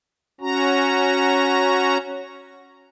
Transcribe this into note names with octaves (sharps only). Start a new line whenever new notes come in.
C#4 F#4 A#5